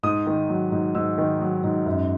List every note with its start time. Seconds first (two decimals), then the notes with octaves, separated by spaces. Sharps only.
0.03 G#2 D#6
0.26 D#3
0.49 F#3
0.72 G#2
0.95 G#2 E6
1.18 D#3
1.41 F#3
1.64 G#2
1.86 F#2